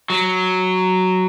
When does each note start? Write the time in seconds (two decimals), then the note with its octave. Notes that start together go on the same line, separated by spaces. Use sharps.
0.10 F#3